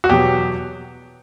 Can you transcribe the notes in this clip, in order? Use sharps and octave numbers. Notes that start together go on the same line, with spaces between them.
F#4
E2 B2 F#3 G4